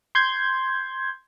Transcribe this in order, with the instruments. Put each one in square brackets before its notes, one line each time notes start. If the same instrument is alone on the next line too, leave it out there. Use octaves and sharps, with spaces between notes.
[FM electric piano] C6 G6 G#6